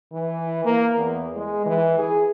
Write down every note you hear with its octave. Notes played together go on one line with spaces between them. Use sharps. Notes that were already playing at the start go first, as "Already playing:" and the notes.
E3
A#3
E2
G#3
E3
G#4